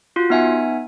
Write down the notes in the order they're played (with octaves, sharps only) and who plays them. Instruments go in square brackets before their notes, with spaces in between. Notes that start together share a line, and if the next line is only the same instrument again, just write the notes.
[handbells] F4 F#4
B3 D#4 E5 F#5 G#5